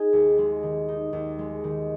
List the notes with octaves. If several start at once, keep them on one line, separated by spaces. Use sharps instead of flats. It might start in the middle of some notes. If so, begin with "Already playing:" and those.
Already playing: D#4 G#4
D#2
G#3
D#3
D#4
D#2
G#3
D#3